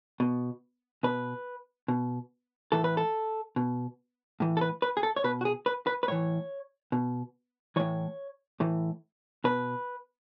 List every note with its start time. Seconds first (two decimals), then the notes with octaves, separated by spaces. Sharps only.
0.20 B2
1.03 B2 B4
1.88 B2
2.72 A2 E3 A4
2.84 B4
2.97 A4
3.56 B2
4.40 A2 E3
4.57 A4
4.61 B4
4.82 B4
4.97 G#4
5.03 A4
5.16 C#5
5.24 B2 B4
5.41 F#4
5.45 G#4
5.66 B4
5.87 B4
6.03 B4
6.08 A2 E3 C#5
6.92 B2
7.76 A2 E3 C#5
8.60 A2 E3
9.44 B2 B4